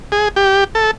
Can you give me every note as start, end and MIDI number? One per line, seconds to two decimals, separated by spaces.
0.12 0.28 68
0.36 0.64 67
0.75 0.91 69